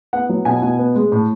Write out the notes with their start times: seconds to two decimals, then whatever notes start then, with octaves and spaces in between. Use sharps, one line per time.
0.13 B3 F#5
0.29 F#3
0.45 B2 G#5
0.62 B2
0.79 B3
0.95 G#3
1.12 A2